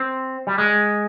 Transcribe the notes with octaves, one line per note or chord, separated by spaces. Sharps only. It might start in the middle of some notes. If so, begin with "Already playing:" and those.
Already playing: C4
G3
G#3